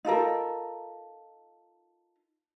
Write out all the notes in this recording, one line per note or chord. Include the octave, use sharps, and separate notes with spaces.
D#4 F4 A4 A#4